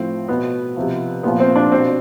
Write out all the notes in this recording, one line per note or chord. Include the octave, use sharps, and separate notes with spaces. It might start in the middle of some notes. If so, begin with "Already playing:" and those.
Already playing: A2 F3 C4
B2 B3
C3 F3
A#2 F3 B3
C4
D4
B2 C4